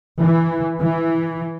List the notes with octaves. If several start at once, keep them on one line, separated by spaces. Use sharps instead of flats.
E3
E3